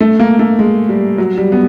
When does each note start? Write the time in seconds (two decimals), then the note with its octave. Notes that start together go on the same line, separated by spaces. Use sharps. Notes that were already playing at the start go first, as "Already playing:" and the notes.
0.01 A3
0.20 A#3
0.39 A3
0.59 G#3
0.89 G3
1.18 F#3
1.38 G3
1.52 B3